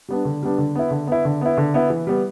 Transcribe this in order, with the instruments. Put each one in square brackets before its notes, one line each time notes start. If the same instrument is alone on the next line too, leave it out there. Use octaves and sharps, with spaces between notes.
[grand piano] G3 B3 D4
D3
G3 B3 D4
D3
B3 E4
D3
B3 E4
D3
B3 E4
D3
B3 E4
E3
G3 B3